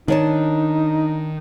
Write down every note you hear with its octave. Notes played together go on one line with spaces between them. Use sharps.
D#3 D4 D#4 C#5 A5